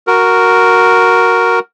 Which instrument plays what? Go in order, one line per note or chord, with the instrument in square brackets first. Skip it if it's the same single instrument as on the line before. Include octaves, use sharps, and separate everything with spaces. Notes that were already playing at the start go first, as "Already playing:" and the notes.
[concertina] F#4 A#4